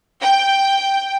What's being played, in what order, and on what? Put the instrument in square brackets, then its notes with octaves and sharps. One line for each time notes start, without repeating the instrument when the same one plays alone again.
[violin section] G5